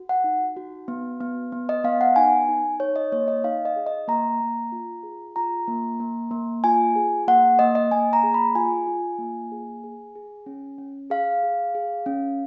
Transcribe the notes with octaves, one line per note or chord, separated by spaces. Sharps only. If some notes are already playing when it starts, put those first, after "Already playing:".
Already playing: F#4
F#5
D#4
F#4
B3
B3
B3
D#5
B3 F5
F#5
D#4 G#5
D#4
D#4 C#5
D#5
A#3 C#5
D#5
D#4 F5
D#5
G#4
D#5
A#3 A#5
A#3
F4
G#4
F4 A#5
A#3
A#3
A#3
F4 G#5
G#4
A#3 F#5
A#3 D#5
D#5
A#3 G#5
A#5
G#4
B5
F4 G#5
F4
A#3
G#4
G#4
G#4
C#4
C#4
G#4 F5
G#4
G#4
C#4